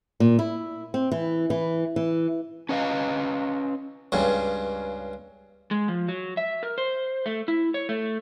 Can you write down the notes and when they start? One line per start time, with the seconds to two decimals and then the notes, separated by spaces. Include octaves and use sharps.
0.20 A#2
0.39 E4
0.94 C4
1.12 E3
1.50 E3
1.96 E3
2.69 C#4 B4 D#5 F5
4.12 C#2 G2 C#3
5.71 G#3
5.88 F3
6.08 F#3
6.37 E5
6.63 A#4
6.78 C5
7.26 A3
7.48 E4
7.74 C#5
7.89 A3